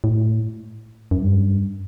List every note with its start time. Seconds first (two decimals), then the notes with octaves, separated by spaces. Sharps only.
0.04 A2
1.11 F#2
1.22 G2